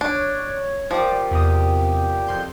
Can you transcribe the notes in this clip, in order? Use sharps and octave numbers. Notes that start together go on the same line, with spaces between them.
D4 C#5
A#2 F3 G4 D5 D6
E2 C3 D#6
F2 C6 G6